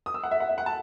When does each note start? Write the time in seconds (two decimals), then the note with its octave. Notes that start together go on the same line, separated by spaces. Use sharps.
0.06 D#6
0.14 E6
0.23 F#5
0.31 E5
0.40 F#5
0.49 E5
0.58 F#5
0.66 A5